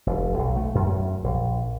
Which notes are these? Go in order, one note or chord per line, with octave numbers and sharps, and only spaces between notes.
F1
B1
A3
F#2
A#1